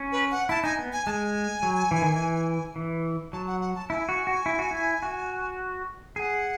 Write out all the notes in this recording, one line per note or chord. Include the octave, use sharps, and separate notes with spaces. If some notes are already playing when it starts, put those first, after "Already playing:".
Already playing: C#4
B4
F#5
E4 A5
D#4 G#5
B3
G#5
G#3 G#5 A5
F#3
E3
D#3
E3
E3
F#3 A5
F#5
F#5
A5
E4 G#5 A5
F#4
F#4
E4
F#4
E4
F#4
G#4 F#5 G#5